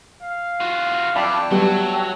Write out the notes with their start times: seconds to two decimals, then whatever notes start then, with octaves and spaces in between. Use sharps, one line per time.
0.22 F5
0.60 F4 F#4
1.16 F2 D5 E5 G5 A5 B5
1.51 F#3 G3 A3 B3 G4